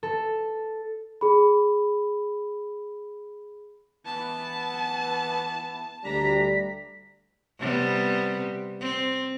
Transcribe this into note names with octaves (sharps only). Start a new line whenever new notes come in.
A4
G#4 B5
E3 B3 A5
D2 G3 D4 A#5 B6
C3 G3 B3
C4